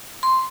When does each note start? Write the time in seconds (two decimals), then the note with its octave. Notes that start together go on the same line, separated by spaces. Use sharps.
0.23 C6